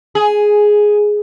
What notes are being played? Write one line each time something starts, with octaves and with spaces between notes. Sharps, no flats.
G#4